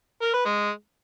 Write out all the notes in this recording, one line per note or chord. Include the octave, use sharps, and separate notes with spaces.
A#4
B4
G#3